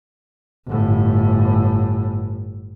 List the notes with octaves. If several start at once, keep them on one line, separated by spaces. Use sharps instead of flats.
G1 A2